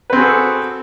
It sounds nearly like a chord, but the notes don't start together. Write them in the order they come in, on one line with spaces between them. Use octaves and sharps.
B4 C4 G#4 F#4 A4